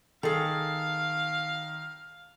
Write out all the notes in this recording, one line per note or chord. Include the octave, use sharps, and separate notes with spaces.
D#3 G#4 A4 F5